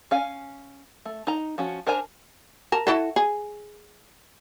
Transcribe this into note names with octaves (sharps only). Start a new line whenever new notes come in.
C#4 F5 G#5
A3
D#4 A#5
F3 C#4 F#4
D4 A#4 C5 G#5 A#5
A#4 A5
E4 F#4 A4
G#4